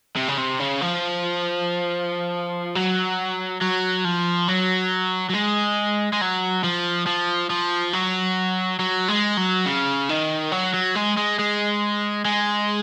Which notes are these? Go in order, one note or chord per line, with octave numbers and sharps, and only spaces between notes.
C3
C#3
C3
C#3
F3
F#3
F#3
F3
F#3
F#3
G#3
G#3
F#3
F3
F3
F3
F#3
F#3
G#3
F#3
C#3
D#3
F#3
F#3
G#3
G#3
G#3
G#3